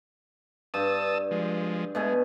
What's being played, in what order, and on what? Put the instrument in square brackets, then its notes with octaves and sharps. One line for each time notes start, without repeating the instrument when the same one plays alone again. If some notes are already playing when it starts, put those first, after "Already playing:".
[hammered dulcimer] G2 [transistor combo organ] A5 D#6 E6
[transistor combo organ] F3 G#3
[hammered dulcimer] B2 A3 G#5 [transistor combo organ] G#3